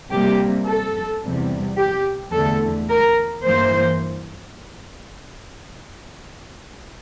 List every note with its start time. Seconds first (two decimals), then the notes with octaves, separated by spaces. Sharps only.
0.10 C3 G3 A#3 G4
0.67 A4
1.23 E2 C3 G3
1.77 G4
2.33 E2 D3 A3 A4
2.89 A#4
3.45 G2 E3 A#3 C5